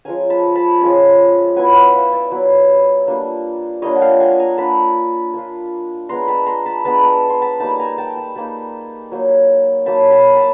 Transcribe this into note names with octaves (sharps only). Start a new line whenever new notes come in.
F3 G#3 C#4 G#5 A#5
A5 B5
A5 B5
F3 G#3 C#4
F#3 B3 E4 F#5 G#5
E5 F#5
D#5 F5
D5 E5
F#3 B3 E4
G3 A#3 D4 F4
G3 A#3 D4 F4 C#5 D#5
F#5
F5 G5
F#5 G#5
G#5 A#5
A#3 D4 F4 A5 B5
A#3 D4 F4
G#3 B3 D4 A#5 C6
A5 B5
A#5 C6
A5 B5
G#3 B3 D4 A5 B5
A5 B5
C6
A5 B5
G3 A#3 D#4 A5 B5
G#5 A#5
G5 A5
A5 B5
G3 A#3 D#4 A5 B5
F#3 A#3 D#4
F#3 A#3 D#4 A5 B5
A5 B5
A5 B5